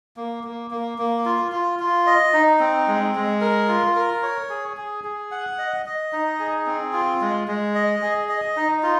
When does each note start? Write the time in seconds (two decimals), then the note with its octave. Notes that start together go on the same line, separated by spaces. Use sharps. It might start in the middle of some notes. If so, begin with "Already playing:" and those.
0.17 A#3
0.44 A#3
0.71 A#3
0.98 A#3
1.25 F4
1.52 F4
1.79 F4
2.07 D#5
2.33 D#4
2.60 C4
2.87 G#3
3.15 G#3
3.41 A#4
3.68 F4
3.96 A#4
4.23 C#5
4.50 G#4
4.77 G#4
5.04 G#4
5.31 F#5
5.58 D#5
5.86 D#5
6.13 D#4
6.40 G#4
6.66 C4
6.93 F4
7.21 G#3
7.48 G#3
7.75 D#5
8.02 G#4
8.29 D#5
8.56 D#4
8.83 F4